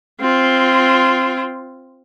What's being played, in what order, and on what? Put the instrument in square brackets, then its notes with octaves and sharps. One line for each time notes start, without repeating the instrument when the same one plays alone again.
[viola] C4 F4